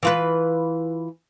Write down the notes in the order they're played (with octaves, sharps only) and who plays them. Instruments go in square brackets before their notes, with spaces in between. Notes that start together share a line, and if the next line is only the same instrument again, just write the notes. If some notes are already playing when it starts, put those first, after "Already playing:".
[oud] E3 F4 B4